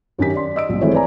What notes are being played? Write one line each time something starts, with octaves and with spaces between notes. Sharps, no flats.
F#2 D#3 C#4 G4 A#4 B6
D5 C6
D#5 E6 D7
A#1 F3
E3 G#3 A3 C4 F#4 C#5
B4 D5 G#5 A#5